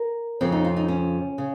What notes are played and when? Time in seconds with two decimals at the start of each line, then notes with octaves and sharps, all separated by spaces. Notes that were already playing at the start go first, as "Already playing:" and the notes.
Already playing: A#4
0.41 F2 C#3 F3 C4
0.52 D#4
0.64 F4
0.76 D#4
0.88 C#4
1.38 C#3